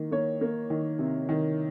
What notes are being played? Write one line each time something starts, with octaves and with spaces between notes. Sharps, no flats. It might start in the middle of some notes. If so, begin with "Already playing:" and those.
Already playing: D#3 A#3
A#3 C#5
A#3
D#3
C3
D#3